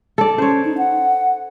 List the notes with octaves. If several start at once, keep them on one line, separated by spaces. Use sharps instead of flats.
A4 D5
C#4 C5 C#5
D#4
F#5